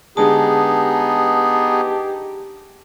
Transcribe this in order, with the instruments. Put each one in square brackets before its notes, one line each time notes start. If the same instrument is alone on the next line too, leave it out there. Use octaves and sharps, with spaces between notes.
[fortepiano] D3 G#3 [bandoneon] B3 D#4 G#4 [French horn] G4 [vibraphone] A5